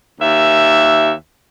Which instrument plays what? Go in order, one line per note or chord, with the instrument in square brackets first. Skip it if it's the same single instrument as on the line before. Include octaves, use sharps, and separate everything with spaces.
[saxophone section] D#2 E5